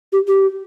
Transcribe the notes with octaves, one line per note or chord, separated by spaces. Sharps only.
G4
G4